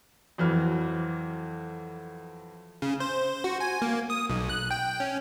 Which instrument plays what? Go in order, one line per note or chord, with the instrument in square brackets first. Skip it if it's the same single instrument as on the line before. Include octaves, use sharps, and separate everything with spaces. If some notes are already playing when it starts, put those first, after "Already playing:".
[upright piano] F2 E3 F#3 F6
[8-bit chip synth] C#3
C5
F#4
G#5
A#3
D#6
B1
F#6
G5
C#4